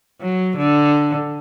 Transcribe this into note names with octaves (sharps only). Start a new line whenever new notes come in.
F#3
D3